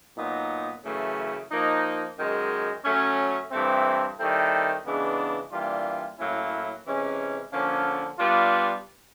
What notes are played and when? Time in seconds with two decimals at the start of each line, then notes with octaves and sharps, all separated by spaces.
0.17 A#2 F#3 B3 D#4
0.83 F#2 C#3 E3 A3
1.51 F3 A#3 D#4
2.17 F#2 D#3 G#3
2.84 F#3 A3 C#4
3.51 G2 E3 A3 C4
4.18 D#3 G3 C4 E4 A4
4.85 C#3 E3 G#3 B3 D4
5.52 E3 G3 A#3 D4 F4
6.18 A2 F#3 A#3 C#4 E4
6.85 C3 E3 G#3 C#4
7.52 D3 F3 A#3 C#4
8.19 G3 B3 D4 F4